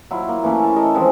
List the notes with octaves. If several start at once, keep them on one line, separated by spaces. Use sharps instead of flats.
F#3 E4 F4
A#3
E3 A3 A#3 C#4
A5
A4 A#4 D#5 A5
E3 F3 G#3 C4